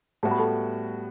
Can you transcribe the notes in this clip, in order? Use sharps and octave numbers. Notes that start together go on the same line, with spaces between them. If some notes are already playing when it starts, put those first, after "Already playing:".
A2 G3 B3 F#4 A5
B5
A4 A5